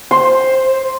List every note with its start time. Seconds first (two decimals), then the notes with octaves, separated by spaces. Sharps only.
0.11 C5 C6